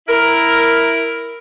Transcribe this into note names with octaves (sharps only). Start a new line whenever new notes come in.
E4 A#4